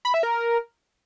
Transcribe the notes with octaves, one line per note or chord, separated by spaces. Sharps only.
B5
E5
A#4